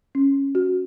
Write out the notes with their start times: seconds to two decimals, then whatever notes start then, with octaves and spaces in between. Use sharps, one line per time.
0.15 C#4
0.55 F#4